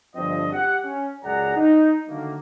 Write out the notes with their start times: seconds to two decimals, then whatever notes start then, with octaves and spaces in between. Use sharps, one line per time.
0.16 G1 F3 C4 D4 D#5
0.52 G4 F#5
0.83 C#4
1.24 C#2 F#2 G#4 D5 F#5 A#5
1.56 D#4
2.08 D3 D#3 F#3 A3 A#3